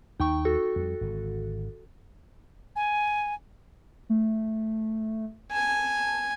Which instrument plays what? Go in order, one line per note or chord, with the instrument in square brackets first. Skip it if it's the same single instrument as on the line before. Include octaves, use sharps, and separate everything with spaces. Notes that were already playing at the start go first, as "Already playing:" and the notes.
[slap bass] D#2 [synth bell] D#4 G5 C#6
[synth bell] F#4 A4
[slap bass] F2 G3
G#1 D3
[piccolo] G#5
[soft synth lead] A3
[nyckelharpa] G#5 [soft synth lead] A5